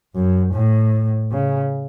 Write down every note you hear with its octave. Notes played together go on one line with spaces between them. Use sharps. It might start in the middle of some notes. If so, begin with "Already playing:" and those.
F#2
A2
C#3